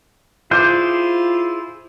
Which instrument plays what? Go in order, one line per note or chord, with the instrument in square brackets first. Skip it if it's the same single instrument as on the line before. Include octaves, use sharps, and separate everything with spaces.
[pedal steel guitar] E4 G#4 C5 [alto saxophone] F4 [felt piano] D6 G6